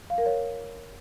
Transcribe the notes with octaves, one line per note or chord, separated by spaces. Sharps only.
F5
A#4
C#5